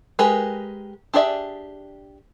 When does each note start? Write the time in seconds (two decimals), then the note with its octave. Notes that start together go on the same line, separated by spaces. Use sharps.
0.19 G#3 G4 G#4 A#4 B4
1.14 D4 G4 G#4 D5 E5